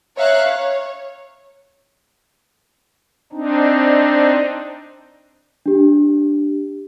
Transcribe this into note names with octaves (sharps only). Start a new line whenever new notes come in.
C#5 E5 F5 A#5 C#6 F#6
C#5
C4 D4 D#4
D4 G4